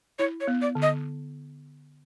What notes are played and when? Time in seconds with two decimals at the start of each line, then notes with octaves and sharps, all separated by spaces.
0.19 E4 C#5
0.41 C#5
0.47 B3
0.62 D5
0.75 D3
0.82 D#5